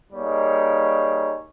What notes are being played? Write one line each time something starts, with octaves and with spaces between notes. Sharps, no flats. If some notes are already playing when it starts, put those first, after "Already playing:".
G3 A#3 D#4 G#4 C#5